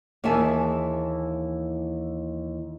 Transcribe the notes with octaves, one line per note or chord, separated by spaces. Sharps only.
D#2 E3 G#4 E5 G#5 A5